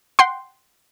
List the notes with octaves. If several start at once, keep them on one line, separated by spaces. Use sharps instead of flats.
F#5 G5 C6